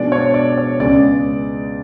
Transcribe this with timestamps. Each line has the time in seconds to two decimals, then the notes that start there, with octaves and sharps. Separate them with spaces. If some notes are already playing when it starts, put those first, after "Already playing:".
Already playing: B2 G#3 D4 D5
0.12 C#5
0.34 D5
0.58 C#5
0.79 C#2 C#3 G#3 B3 D5